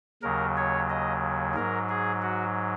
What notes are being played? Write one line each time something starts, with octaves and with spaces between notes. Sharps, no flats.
D#2 C#3 F#3 A#4
C#5
D#5
G#2 F#3 A#4
G#4
F#4